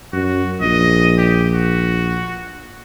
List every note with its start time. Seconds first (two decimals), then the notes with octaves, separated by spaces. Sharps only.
0.13 F#2 F#4
0.61 A#1 D#5
1.18 G4
1.54 F#4